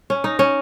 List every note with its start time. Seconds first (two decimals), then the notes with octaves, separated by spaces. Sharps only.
0.10 C#4
0.24 D#4
0.39 C#4